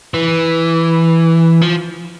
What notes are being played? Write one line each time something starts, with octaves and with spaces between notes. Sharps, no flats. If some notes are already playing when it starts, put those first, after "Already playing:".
E3
F3